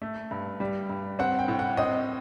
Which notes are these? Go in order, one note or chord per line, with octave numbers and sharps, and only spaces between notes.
A3
G2
G3
G2
C4 F#5
G5
A2
F#5
C4 D#5